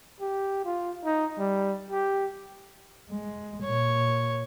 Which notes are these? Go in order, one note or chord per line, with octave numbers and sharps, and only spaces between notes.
G4
F4
D#4
G3
G4
G#3
A#2 C#5